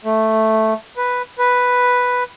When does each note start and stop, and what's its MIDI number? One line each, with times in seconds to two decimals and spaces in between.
0.05 0.73 57
0.97 1.22 71
1.39 2.23 71